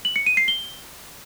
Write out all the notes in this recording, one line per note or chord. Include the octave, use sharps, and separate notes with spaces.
F#7
C#7
D#7
C7
G7